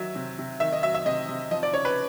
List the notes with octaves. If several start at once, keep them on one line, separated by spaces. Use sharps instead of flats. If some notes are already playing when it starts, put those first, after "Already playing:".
Already playing: D#3 F#3 E5
C3
C3
D#3 E5
D#5
F#3 E5
E5
C3 D#5
C3
F3 D#5
D5
C#3 C#5
B4